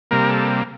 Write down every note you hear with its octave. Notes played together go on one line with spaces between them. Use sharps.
C3 G3 A#3 A#4
A4